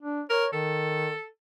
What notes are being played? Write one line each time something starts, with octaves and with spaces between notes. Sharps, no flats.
D4
A#4 C#5
D#3 A4